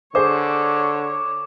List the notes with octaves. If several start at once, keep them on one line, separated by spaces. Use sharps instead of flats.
D3 G#4 C5 C#5 D6